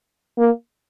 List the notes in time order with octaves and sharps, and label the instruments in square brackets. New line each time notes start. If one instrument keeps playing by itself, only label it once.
[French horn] A#3